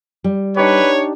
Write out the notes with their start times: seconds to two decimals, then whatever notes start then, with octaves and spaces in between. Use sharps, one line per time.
0.24 G3
0.57 D4 D#4 G4 B4 C#5